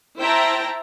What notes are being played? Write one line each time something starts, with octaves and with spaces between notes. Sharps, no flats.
E4 C5 E5 G5 A5 A#5